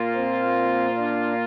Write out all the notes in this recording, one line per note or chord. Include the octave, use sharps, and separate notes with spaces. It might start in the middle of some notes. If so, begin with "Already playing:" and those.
Already playing: A#2 A#3 F4
C4
D4